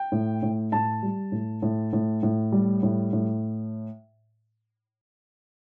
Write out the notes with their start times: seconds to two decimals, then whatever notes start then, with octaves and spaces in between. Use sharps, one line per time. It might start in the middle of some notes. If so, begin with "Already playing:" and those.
Already playing: G5
0.12 A2
0.43 A2
0.72 A2 A5
1.03 G3
1.32 A2
1.62 A2
1.93 A2
2.23 A2
2.52 G3
2.83 A2
3.13 A2